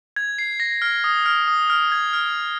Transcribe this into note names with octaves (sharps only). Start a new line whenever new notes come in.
G#6
C7
A#6
F6
D#6
F6
D#6
F6
G#6
F6